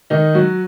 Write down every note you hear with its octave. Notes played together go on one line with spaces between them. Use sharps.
D#3 D#4
F#3 F#4